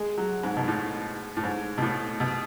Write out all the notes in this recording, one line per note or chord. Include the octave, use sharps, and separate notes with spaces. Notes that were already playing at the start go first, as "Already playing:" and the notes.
Already playing: G#3
F#3
G#2
B2
A2
A2
G#2
B2
A2
B2